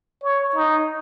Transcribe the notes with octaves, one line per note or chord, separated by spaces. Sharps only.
C#5
D#4